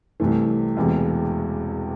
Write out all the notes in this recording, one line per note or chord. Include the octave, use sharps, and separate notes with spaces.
C2 C3 E3 A3
E1 E2 C3 E3